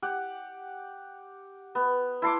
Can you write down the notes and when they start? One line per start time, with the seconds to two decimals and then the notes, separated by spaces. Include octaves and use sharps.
0.02 G4 F#5
1.75 B3
2.22 E4 A4 C6 D6